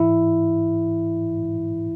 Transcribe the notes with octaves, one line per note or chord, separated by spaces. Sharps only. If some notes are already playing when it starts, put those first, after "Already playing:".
Already playing: G#2 E3 E4